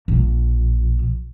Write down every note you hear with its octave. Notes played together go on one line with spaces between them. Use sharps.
A#1